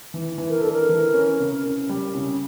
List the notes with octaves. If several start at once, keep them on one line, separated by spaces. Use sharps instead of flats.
E3
E3
A#4
D4 A4
A#4
E3
C#4
C#3
C#3
G3
C#3